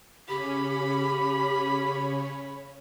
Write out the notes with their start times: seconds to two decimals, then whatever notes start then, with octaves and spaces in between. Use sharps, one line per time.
0.28 C#3 C#4 G4 B5